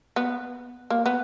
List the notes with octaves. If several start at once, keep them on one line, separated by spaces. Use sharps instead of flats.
B3
A#3
B3